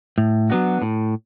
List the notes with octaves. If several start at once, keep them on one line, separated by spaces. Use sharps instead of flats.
A2
F#3 B3 D4 F#4
A2